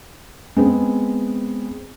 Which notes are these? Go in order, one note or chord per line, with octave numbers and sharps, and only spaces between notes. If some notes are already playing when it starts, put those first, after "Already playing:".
G#3 B3 C4